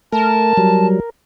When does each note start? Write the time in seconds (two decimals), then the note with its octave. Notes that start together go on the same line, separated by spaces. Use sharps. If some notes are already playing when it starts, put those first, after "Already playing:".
0.12 A3 A#4 A5
0.57 F#3 G3